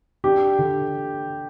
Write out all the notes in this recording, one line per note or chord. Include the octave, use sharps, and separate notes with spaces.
D4 G4
D3